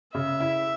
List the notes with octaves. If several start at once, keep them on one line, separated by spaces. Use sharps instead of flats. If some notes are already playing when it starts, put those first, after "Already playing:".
C#3 E5
E4